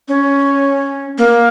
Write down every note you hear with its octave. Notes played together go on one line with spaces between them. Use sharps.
C#4
A#3